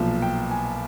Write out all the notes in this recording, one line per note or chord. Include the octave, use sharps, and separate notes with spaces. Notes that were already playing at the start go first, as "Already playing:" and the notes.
Already playing: B1 A#2 F3
G5
G#5